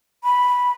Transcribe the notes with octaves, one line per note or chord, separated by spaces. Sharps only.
B5